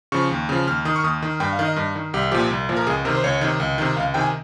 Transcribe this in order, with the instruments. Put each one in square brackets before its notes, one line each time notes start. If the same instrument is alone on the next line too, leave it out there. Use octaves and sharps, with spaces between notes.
[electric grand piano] C#3 F3 C#6
D#2
C#3 F3
D#2 F6
D#3 D#6
C#6
D#2 D#6
D#3
G2 G5
F5
D#3
D#5
G2
D#3
C2 G4
A#2 F3 G4
C2
A#2 F3
A#4
C#2 G#4
C3 D#3 A#4
C5
C#2 C#5
C3 D#3
C#2
C3 D#3
C#2 F5
C3 D#3 G5
G#5